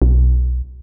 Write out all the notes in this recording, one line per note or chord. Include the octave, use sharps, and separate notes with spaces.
B1